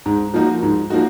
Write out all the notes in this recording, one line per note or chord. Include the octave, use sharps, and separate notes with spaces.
G#2
F3 A#3 D#4 F#4
G#2
F3 A#3 D#4 F#4